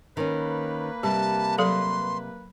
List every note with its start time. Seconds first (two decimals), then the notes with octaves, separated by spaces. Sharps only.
0.17 D#3 A#3 C#4 B4
1.03 C3 G3 G4 A5
1.58 F#3 A4 F5 C6